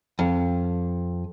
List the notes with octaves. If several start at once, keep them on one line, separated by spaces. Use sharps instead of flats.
F2